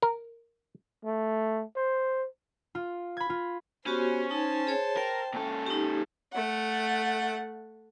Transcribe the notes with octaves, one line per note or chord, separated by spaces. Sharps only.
A#4
A3
C5
F4
B5 G#6
F4
B3 C#4 F#4 G4 C5
D#4 C5 A5
G#4 C#5
A#4 G5
A#2 C#4 A4
D#4 G4
A3 F#5